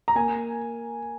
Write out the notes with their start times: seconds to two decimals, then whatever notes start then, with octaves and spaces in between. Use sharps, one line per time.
0.08 A#5
0.15 A#3 G#5